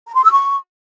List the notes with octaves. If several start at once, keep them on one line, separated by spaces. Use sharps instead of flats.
A#5
C6
E6
C#6